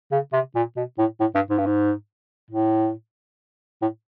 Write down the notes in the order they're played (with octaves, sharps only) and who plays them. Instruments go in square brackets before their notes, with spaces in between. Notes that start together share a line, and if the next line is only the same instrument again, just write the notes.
[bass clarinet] C#3
C3
A#2
B2
A2
A2
G2
G#2
G2
G#2
A2
A2